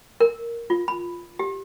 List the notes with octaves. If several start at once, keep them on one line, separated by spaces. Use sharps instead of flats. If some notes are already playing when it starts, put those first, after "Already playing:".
A#4
F4
B5
G4